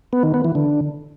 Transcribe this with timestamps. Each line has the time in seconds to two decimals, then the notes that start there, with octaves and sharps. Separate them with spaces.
0.13 B3
0.23 D#3
0.34 B3
0.45 E3
0.55 D3